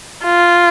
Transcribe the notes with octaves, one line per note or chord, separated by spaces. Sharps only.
F4